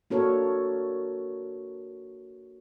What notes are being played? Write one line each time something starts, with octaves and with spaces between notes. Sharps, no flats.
A#3 D4 F#4 A4 A#4 C#5